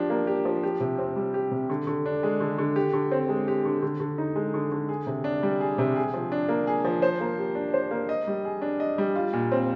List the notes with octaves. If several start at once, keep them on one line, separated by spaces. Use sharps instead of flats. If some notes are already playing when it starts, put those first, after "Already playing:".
Already playing: F3 D4 G4
A#3
G4
F3
G4
C3
C4
G3
G4
C3
D3
D3
D4
G#3
D3
D3
G4
D3
C4
G#3
G4
D3
D3
D3
D#4
G#3
D3
D3
G#4
C3
D4
G3
G#4
C3
G#4
F3
D4
A#3
G#4
F3
C5
A#3
G4
D4
C5
A#3
D#5
G3
G#4
D4
D#5
G3
F4
A#2
C4